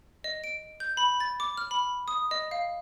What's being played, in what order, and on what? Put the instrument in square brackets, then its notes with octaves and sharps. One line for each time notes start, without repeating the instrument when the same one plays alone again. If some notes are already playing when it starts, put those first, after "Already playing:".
[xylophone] D#5
D7
G6
B5
A6
D6
F6
B5
D#6
D#5
F5